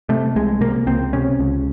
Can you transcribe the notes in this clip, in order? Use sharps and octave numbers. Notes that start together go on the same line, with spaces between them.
C3 A3
C2 G#3
C3 A#3
C#2 C4
C3 C#4
C#2